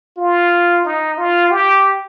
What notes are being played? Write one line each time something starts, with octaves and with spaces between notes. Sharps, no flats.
F4
D#4
F4
G4